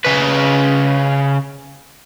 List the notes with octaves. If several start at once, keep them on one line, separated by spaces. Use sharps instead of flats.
C#3 B4